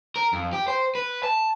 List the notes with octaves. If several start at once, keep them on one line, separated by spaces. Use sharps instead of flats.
A#4
F2
G4
C5
B4
A5